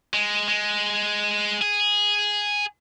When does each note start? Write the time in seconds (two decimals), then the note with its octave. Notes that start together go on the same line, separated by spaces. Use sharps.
0.14 G#3
0.48 G#3
1.62 G#4